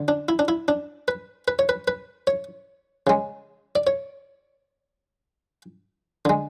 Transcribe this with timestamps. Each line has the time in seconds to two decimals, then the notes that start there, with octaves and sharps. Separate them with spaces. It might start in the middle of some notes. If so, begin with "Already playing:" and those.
Already playing: D3
0.08 D4
0.29 E4
0.39 D4
0.48 E4
0.68 D4
1.08 B4
1.48 B4
1.59 C#5
1.69 B4
1.88 B4
2.27 C#5
3.07 C#3 G#3
3.76 D5
3.87 C#5
6.25 D3 G#3